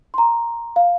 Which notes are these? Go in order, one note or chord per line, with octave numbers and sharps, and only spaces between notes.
C6
A#5
F5